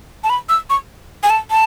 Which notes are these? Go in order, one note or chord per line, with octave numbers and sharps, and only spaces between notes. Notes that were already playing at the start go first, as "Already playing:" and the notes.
A5
B5
E6
C#6
G#5
A5
A5